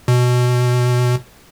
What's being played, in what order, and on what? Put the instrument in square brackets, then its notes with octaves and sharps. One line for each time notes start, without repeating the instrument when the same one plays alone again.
[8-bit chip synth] B2